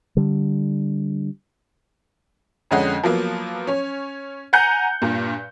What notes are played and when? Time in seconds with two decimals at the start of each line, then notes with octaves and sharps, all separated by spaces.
0.17 D3 G3
2.71 F2 D3 G#3 C#4 D#5 F#5
3.03 F3 F#3 A#3 B3
3.67 C#4 C#5
4.53 F#5 G#5 A#5 F#6 G6 C#7
5.02 G2 A#2